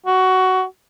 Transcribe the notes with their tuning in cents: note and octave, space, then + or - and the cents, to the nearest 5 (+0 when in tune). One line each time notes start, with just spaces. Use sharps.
F#4 +15